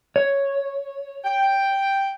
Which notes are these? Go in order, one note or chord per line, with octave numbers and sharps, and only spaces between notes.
C#5
G5